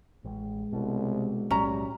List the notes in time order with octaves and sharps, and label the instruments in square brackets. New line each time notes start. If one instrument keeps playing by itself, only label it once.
[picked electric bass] A1 [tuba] G#3
[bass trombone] C2 [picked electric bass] B2
[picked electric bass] B1 A2 F#3 [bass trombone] G3 [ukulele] C#4 A#5